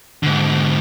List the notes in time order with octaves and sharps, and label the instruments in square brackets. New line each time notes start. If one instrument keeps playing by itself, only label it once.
[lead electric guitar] G#2 D3